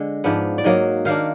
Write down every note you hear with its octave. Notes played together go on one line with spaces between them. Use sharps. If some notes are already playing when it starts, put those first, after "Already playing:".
Already playing: D3 G#3
G#2 F3 B3 D4
D5
G#2 F#3 A#3 D#5
D#3 A#3 D4 F5